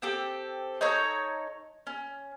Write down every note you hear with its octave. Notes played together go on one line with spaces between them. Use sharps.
C4 G4 A4
D#4 A4 C#5 A#5
C#4